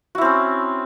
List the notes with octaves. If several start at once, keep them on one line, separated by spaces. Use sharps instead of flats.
C4 C#4 E4 F#4